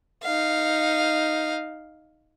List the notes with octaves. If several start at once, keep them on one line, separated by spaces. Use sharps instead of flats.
D#4 F5